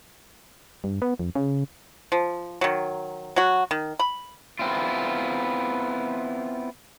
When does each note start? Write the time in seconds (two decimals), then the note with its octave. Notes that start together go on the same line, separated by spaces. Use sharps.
0.84 G2
1.02 B3
1.19 F2
1.35 C#3
2.12 F3
2.61 D#3 F#3
3.36 F#3 F#4
3.71 D#3
3.99 B5
4.59 B3 C4 E4 F4